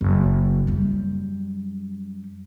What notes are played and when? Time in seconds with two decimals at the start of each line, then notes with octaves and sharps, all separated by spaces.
0.01 F#1
0.67 F#2 G3